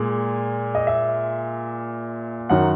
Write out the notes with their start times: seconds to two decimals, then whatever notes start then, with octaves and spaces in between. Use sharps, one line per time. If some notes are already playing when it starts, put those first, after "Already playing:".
Already playing: A#2 G#3
0.75 D#5
0.87 E5
2.49 F#2 D#3 F#3 F#5